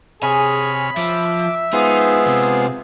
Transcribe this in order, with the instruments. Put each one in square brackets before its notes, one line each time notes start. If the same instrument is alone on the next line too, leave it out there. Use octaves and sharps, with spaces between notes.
[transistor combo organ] C3 C#5 F6 [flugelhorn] G#4 [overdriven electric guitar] G#5 [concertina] B5
[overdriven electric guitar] F3 [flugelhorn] E5 [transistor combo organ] D6
[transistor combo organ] G#3 F4 C5 [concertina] B3 G#4 [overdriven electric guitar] D#4
[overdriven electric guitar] C3